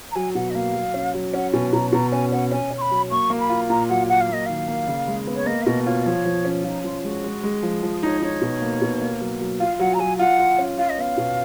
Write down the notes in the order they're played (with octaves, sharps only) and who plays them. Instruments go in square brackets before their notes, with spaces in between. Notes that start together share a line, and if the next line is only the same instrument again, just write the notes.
[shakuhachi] A#5
[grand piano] F#3 [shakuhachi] G#5
[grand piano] B2 [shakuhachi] F#5
[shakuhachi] D#5
[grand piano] A#3 [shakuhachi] F5
[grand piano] F#3
C#4
F#3
[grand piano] C#4 [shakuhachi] F#5
[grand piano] B2 [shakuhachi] G#5
[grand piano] B2 [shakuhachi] A#5
[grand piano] B2 [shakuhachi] A#5
[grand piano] C#4 [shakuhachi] G#5
[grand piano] C#4 [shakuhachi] F#5
[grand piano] C#4 [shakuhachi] G#5
[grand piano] C#4
[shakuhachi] C#6
B5
[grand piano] F#3
[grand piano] A#3 [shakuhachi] C#6
[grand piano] A#3
[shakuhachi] B5
[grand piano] F4
[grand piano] A#2 [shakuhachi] A#5
[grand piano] F#3 [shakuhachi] F#5
[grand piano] F#3 [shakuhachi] F#5
[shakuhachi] F5
[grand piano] A#3 [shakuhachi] D#5
[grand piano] D#3 [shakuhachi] F5
[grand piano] A#3
C#3
G#3
B3
[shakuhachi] C#5
[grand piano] A#3 [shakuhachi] D#5
[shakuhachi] F5
[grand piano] B2 [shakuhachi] D#5
[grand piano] F4 [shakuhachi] C#5
[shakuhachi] D#5
[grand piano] F3 [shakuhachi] C#5
[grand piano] F3
C#4
[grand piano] F3 [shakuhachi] D#4
[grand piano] F3 [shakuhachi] F4
[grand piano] G#3 [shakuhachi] F#4
[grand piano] G#3
G#3
F3
[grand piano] F3 [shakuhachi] G#4
[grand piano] D#4 [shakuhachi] C#5
[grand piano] D#4 [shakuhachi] C#5
[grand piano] B2
A#3
B2
A#3
F#3
F#3
[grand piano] F4 [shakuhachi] F5
[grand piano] F#3 [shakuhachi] F#5
[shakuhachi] A#5
[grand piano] F#3 [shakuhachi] G#5
[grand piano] F4 [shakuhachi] F#5
[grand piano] F4
C#4
[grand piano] F4 [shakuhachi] F5
[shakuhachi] D#5
[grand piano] B3 [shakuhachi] F5
[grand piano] B2